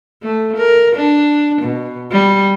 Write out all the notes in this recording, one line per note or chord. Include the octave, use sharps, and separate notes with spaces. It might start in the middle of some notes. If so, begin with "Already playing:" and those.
A3
A#4
D4
B2
G3